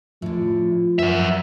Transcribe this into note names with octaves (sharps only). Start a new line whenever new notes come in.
A2 D3 F3
F#2 F#3 C5 E5